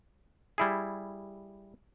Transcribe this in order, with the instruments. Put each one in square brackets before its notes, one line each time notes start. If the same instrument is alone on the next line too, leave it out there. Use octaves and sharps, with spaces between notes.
[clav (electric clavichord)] G3 E4 G#4